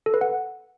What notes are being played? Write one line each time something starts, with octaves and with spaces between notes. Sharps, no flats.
A4
B4
F#5